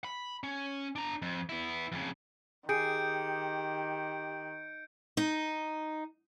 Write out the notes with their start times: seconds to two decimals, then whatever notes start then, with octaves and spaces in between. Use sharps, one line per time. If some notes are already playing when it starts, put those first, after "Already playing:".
0.04 B5
0.44 C#4
0.96 D4 A#5
1.22 F2
1.49 B3 E4
1.92 F2 C#3
2.69 D#3 G4 G#4 G6 C#7 D7
5.17 D#4